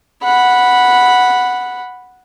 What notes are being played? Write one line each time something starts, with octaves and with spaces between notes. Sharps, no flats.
F#5 B5